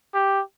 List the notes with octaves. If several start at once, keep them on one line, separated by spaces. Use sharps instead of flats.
G4